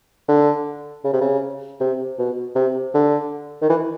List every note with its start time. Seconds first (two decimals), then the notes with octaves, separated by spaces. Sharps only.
0.28 D3
1.04 C#3
1.13 C3
1.21 C#3
1.80 C3
2.19 B2
2.55 C3
2.94 D3
3.62 D#3
3.69 E3